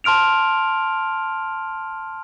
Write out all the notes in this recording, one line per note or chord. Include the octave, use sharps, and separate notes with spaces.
A5 C6 F6 D7 F7